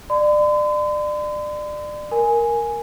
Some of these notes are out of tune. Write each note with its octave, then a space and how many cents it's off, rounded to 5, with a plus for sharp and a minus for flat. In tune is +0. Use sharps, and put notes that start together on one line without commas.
D5 +30 C6 -45
A#4 +0 G#5 +0